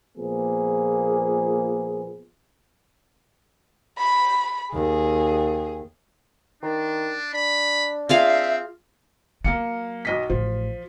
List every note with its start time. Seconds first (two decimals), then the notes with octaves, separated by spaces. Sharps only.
0.17 A#2 F3 A#3 B3 G#4
3.98 B5
4.73 D#2 G#4
6.63 D#3 D4
7.33 D4 B5
8.09 C4 F4 G#4 E5 F5
9.44 F#3 A#3 F5 C#7
10.05 B1 D#5 B6
10.30 A1 F3